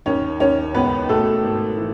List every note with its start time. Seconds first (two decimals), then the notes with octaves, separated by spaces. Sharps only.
0.06 D#2 C#4 C#5
0.40 D#2 C#4 C#5
0.74 C#2 B3 B4
1.08 B2 A3 A4
1.43 G#1
1.77 E3